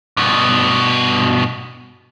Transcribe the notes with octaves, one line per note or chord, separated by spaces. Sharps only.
G2 B2